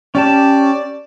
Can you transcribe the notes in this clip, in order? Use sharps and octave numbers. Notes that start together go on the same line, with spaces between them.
C#4 G4 D5 A5